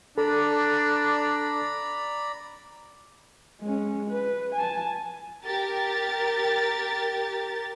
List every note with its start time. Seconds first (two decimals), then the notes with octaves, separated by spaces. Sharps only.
0.18 D4 A4 D5 A#5 B5
3.61 G#3 C#4
4.10 B4
4.55 G#5 A5
5.44 G4 A#4 A6